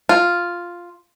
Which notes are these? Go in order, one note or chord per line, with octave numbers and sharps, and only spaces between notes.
F4